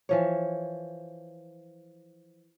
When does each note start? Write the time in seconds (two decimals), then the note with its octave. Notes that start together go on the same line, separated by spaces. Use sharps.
0.09 E3 F3 C#5